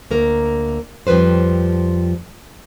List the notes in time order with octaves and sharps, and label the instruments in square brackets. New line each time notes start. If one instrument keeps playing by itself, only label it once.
[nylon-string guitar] D2 A#3 A#4
F2 F3 G3 B4 C5